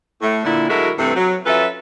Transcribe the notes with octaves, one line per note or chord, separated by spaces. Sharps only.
A2 A3
A#2 D3 E4
D3 F#3 G#3 E4 F#4 A#4
G2 C3 E3 A3 C4
F#3
F#3 C#4 F4 A4 B4 E5